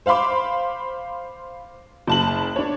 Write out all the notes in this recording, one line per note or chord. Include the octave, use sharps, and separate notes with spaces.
C5 F5 B5 C6 D6
F#1 A5 F#7
D4 C#5